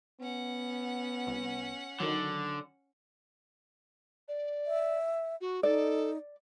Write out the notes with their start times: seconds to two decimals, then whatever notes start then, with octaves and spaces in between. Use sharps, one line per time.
0.21 B3 C#4 F#5
1.27 C2
2.00 D3 D#3 F#3
4.28 D5
4.67 E5
5.41 F#4
5.63 D#4 A4 D5